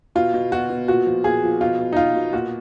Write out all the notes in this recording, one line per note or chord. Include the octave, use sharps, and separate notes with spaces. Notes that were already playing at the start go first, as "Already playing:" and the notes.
B2 F4
B2
B2 F#4
B2
A#2 F#4
F3
A#2 G#4
F3
B2 F4
B2
D#4
B2 F4
B2
A#2 F#4